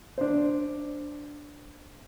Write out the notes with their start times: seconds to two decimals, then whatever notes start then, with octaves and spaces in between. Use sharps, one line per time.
0.18 D4 C5